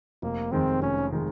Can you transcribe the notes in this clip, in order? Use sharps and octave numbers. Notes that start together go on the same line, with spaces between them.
F1 A#3
F2 D#3 G#3 C4
F1 C#4
D#3 G#3